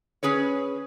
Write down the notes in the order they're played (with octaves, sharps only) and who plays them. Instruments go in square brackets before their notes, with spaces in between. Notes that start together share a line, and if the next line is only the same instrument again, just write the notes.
[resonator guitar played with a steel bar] C#4 G#4 B4 C#5